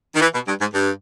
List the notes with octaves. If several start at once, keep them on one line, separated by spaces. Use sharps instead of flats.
D#3
E3
B2
G2
G#2
G2